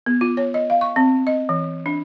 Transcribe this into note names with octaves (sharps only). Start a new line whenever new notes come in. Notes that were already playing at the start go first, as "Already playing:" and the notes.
B3
F4
C#5
D#5
F5
C#6
C4
D#5
E3
D4